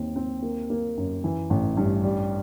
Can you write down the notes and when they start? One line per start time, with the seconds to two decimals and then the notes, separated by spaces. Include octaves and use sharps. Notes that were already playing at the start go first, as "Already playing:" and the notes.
Already playing: D#2 C4
0.16 C4
0.42 A#3
0.70 A#3
0.97 F#2
1.24 E3
1.50 A1
1.77 G2
2.04 G3